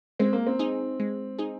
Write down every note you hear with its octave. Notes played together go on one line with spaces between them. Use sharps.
G#3 C4
A#3
C4
D#4 G#4
G#3
D#4 G#4